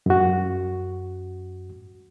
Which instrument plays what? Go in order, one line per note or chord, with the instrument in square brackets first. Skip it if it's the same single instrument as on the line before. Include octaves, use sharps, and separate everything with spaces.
[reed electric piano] F#2 F#4